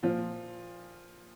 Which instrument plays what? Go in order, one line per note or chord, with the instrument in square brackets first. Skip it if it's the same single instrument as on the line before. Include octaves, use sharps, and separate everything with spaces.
[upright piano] A#2 F3 F4